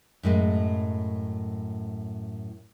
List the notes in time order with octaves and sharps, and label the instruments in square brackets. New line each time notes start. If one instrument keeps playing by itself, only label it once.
[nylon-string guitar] F#2 A2 G#3